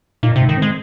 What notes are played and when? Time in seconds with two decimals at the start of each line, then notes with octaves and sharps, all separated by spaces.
0.23 A#2 D#4
0.36 C3
0.40 G#2
0.49 D#3
0.57 G#3 C4